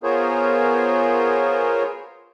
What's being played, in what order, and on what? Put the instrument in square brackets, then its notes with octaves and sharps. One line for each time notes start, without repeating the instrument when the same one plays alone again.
[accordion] B3 F4 G#4 A#4 C5 C#5